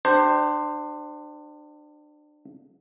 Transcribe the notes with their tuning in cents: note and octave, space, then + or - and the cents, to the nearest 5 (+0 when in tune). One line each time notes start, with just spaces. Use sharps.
D4 +30 G4 -25 C5 +0